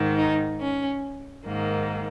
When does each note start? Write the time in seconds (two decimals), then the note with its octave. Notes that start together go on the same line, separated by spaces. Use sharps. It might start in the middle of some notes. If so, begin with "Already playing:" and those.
Already playing: G#2 D#3
0.17 D#4
0.60 C#4
1.46 G#2 D#3 A#3